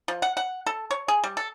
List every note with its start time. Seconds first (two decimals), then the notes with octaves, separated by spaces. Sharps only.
0.08 F3
0.22 F#5
0.37 F#5
0.67 A4
0.91 C#5
1.08 G#4
1.24 G3
1.37 A4